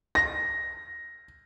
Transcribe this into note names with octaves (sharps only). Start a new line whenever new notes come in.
A#6